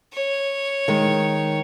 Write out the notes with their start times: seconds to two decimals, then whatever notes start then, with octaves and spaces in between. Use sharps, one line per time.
0.13 C#5
0.88 D#3 G#3